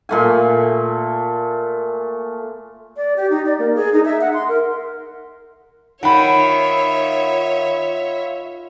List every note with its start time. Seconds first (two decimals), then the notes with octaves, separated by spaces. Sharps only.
0.09 A#2 A3 G#5
2.97 D5
3.16 G4
3.30 D#4
3.46 D5
3.59 A#3
3.75 G#4
3.93 D#4
4.05 E5
4.21 F#5
4.34 C6
4.49 A#4
6.03 D#3 F4 C#5 E5 F#5 B5